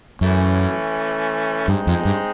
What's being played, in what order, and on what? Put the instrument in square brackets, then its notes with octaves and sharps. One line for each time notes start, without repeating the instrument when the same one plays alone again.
[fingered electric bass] F#2 [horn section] E3 A3 C#4
[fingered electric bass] G2 [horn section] G#3 C4 D#4
[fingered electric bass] F2
G2